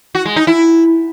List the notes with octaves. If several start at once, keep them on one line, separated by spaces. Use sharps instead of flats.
F#4
G#3
D#4
E4